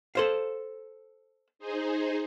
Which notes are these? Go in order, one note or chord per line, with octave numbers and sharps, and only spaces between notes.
A4 C5 F5
D#4 G#4 C5